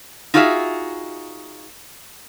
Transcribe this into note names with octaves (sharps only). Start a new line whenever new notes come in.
D#4 F4 F#4 G#4 D5 E5